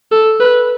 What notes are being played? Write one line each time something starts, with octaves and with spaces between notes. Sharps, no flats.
A4
B4